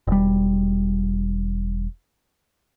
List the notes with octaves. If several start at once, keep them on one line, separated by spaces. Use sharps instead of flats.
E1 G3